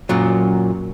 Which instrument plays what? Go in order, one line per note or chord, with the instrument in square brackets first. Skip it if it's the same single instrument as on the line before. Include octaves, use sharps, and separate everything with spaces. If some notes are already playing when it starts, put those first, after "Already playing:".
[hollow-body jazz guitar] F#2 A#2 F#3